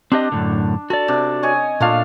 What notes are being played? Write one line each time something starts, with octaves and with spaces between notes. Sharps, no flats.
C4 D4 G4 D#5
F#2 A2 D3
F#4 A4 D5
C3 D4
C#5 D#5 G#5
A#2 A3 D4 F4 F5